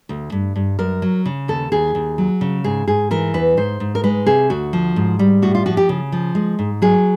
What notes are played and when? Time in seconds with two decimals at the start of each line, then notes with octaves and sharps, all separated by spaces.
0.09 D2
0.32 G2
0.55 G2
0.79 F#2 A#4
1.02 F#3
1.26 C#3
1.48 D#2 A4
1.72 D#2 G#4
1.95 D#2
2.18 F#3
2.41 C#3
2.64 G#2 G#4
2.87 G#2 G#4
3.11 E3 A#4
3.34 E2 B4
3.57 G#2 C5
3.80 G#2
3.95 A#4
4.04 G#3 B4
4.26 C3 G#4
4.50 D2 F#4
4.73 F3
4.96 G#2
5.19 G3
5.42 A2 F#4
5.55 F4
5.66 F3 F#4
5.77 G4
5.89 C#3
6.12 F3
6.35 G#3
6.59 G#2
6.82 F#3 G#4